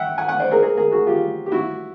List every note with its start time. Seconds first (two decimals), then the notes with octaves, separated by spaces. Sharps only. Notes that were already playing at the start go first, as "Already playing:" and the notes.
Already playing: E5 F#5 G5
0.18 F#5 G#5
0.28 F#5 G#5
0.40 C5 D5
0.51 G#4 A#4
0.62 G#4 A#4
0.77 G#4 A#4
0.91 F#4 G#4
1.07 F4 G4
1.46 G4
1.52 E4 F#4